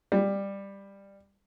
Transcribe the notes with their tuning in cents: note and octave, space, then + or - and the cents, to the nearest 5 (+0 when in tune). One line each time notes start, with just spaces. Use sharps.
G3 +15